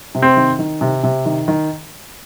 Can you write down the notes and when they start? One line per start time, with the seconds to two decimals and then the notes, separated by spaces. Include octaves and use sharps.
0.15 C3
0.22 C4
0.36 D#3
0.59 D#3
0.81 C3
1.04 C3
1.26 D#3
1.48 D#3